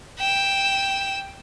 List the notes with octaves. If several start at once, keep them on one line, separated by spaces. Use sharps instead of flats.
G5 E7